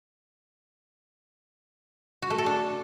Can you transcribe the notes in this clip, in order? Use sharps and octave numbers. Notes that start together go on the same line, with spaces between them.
F#4
A3
A4
D4